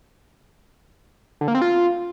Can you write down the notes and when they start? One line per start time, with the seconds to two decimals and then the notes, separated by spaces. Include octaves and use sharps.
1.41 D3
1.48 A#3
1.55 C4
1.61 F4